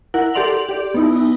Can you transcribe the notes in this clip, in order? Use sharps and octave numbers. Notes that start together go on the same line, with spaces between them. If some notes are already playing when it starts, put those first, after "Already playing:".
E4 A#4 F#5
G4 A4 D5 C6 F7 F#7
G4 D5
B3 D#4 E4